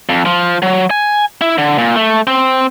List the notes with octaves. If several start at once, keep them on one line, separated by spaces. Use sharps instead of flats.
F2
F3
F#3
G#5
E4
D3
A#2
A3
C4